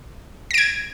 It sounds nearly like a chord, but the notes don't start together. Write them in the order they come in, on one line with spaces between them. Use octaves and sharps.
A#6 D7 G#6